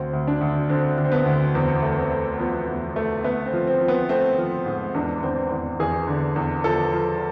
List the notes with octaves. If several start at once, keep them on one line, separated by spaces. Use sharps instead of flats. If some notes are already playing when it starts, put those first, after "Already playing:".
Already playing: D2 C4
D2
D4
D2
D3 C4
D3
C4
B3
D2
E2 C4
A3
C4
A3
F3 B3
E2
A3
A3 B3
C4
F3
C4
F3
B3
A3 C4
F3
G#2
E2 D4
E2 C4
E2
E2 G#4
D3
E2
F3 A4
F3